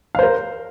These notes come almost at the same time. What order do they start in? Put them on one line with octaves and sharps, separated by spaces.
F5 C5 A#4